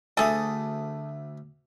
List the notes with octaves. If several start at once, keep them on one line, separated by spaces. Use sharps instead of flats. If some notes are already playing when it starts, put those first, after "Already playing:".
D2 A3 G#4 A4 D#6